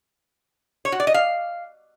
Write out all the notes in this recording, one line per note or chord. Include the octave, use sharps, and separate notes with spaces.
C#5
F#4
D5
D#5
F5